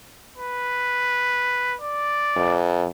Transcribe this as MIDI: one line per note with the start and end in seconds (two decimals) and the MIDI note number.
0.38 1.76 71
1.81 2.58 74
2.36 2.86 41